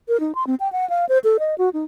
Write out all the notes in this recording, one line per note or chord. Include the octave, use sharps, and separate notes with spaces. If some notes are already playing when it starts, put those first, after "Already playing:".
A#4
D#4
C6
C4
G5
F#5
F5
C5
A4
D#5
F#4
D#4